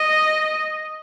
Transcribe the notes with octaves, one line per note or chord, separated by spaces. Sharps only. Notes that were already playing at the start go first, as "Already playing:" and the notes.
Already playing: D#5